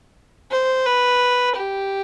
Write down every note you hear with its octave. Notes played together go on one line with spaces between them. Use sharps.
C5
B4
G4